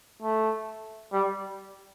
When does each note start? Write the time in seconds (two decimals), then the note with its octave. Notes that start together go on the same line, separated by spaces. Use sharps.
0.23 A3
1.13 G3